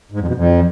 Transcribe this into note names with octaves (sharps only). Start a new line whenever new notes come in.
G#2
F2
B2
F2